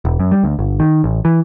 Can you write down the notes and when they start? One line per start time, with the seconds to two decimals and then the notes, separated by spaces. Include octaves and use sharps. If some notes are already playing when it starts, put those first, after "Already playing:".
0.05 E1
0.20 F#2
0.31 G3
0.44 D2
0.59 G1
0.80 D#3
1.04 A1
1.25 E3